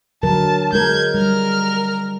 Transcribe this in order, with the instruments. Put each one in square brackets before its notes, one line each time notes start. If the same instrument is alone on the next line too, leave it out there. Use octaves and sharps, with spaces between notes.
[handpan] D3 F#3 A#4 [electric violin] A5
[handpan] G#3 A#4 [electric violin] G6 G#6
[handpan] G3 [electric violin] A#4 F6